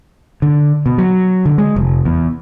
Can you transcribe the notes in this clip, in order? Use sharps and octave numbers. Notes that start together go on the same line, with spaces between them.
D3
B2
F#3
D3
G#3
F1
E2